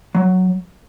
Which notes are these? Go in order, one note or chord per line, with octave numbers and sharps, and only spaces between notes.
F#3